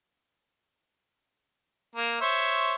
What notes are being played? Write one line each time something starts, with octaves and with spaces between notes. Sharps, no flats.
A#3
C5 C#5 E5